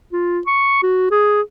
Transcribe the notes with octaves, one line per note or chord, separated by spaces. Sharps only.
F4
C#6
F#4
G#4